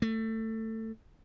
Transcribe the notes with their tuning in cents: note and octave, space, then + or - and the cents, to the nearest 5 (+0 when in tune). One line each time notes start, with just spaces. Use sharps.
A3 +20